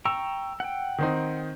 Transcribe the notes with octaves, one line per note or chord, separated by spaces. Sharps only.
G5 A#5 C#6 E6
F#5 G5
D#3 C4 D#4